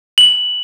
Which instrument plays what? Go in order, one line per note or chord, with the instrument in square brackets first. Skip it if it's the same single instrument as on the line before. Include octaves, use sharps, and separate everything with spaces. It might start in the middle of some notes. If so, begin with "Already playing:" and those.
[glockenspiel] F#7